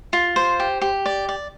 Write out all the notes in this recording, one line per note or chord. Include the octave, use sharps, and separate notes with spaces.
F4
C5
G4
G4
D5
D5